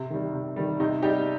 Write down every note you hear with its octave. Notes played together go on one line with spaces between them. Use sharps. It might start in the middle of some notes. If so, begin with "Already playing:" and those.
Already playing: C3
D#3 G3
C3
D#3 G3
C3 D#4
G3 D#4 G4